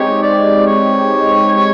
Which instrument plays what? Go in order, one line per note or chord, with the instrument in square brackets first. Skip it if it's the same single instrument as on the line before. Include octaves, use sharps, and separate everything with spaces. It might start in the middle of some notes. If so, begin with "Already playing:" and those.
Already playing: [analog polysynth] G#3 C4 D#4 G4 [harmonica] C#5
[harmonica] D5
C#5